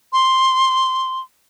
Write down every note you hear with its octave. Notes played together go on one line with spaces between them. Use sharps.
C6